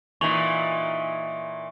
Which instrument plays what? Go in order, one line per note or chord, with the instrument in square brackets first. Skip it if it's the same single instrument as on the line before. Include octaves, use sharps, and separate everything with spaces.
[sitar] A#2 E3 D#4 [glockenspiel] C#6 F7 F#7